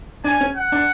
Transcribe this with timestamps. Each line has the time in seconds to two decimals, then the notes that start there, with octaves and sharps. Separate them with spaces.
0.24 D4 G#5
0.41 C#4
0.56 F#5
0.72 D4